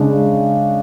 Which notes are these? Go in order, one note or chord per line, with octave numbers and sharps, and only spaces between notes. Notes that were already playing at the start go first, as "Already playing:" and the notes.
Already playing: C#3 G#3 D4